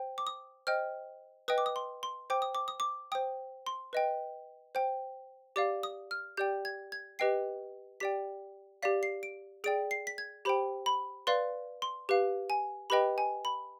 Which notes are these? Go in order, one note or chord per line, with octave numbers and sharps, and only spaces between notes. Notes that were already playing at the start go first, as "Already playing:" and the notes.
Already playing: C5 G5
D6
D#6
C5 D#5 G5 F6
B4 D#5 G5 D#6
D6
D#6
C6
C6
C5 G5 D6
D#6
D6
D#6
D6
C5 G5 D#6
C6
B4 D#5 G5
C5 G5
G4 D5 F5 D6
D#6
F6
G4 D5 G5 G6
G#6
G#6
G4 B4 D#5 G5 C7
G4 D5 G5 B6
G4 D5 F5 B6
C7
D7
G#4 D5 G5 D7
C7
B6
G#6
G4 C5 G5 B5
B5
B4 D5 F5 C6
C6
G4 B4 F5
G#5
G4 B4 D#5 G5 B5
G#5
B5